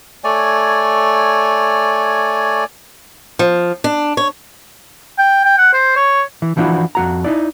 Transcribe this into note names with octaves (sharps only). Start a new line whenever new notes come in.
A3 C#5 D5 G#5
F3
D4
C#5
G5
G5
F#5
C5
C#5
E3
E3 F3 D4 E4 F#4
F2 F#4 A#5
D#4 E4 D5